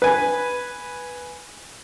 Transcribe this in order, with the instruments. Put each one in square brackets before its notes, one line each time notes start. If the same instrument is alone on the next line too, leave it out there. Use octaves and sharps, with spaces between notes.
[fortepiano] B4 G#5